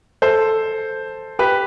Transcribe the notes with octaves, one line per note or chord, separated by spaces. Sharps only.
A4 C5
G4 B4